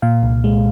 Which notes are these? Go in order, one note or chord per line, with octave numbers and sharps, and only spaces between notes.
A#2 F5
C2
G#3